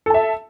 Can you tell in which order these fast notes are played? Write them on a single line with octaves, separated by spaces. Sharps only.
A4 A5 E5